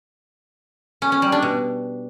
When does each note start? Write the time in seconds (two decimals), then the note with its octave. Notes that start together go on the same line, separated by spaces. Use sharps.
1.02 C#4
1.12 C#4
1.22 G3
1.32 D4
1.42 B2